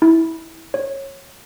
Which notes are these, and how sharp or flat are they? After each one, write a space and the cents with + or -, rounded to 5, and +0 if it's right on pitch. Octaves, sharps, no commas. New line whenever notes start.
E4 -20
C#5 -20